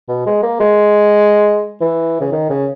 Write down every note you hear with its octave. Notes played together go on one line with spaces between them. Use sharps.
B2
G#3
A#3
G#3
E3
C#3
D#3
C#3